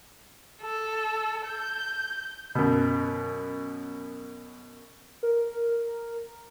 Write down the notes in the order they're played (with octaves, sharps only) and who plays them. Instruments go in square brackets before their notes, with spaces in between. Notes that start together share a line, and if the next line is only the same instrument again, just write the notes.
[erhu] A4
G6
[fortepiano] F#2 B2
[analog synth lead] A#4